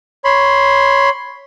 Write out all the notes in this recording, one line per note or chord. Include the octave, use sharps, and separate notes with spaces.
C#5 B5 C6